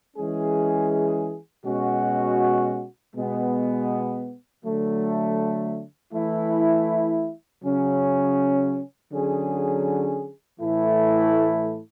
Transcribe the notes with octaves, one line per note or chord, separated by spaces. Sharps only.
E3 G#3 C#4 G#4
B2 G#3 C#4 F#4
B2 G#3 B3
D3 F#3 A3
E3 A3 E4
C#3 F#3 C#4
D3 F#3 C#4 G#4
A2 E3 A3 E4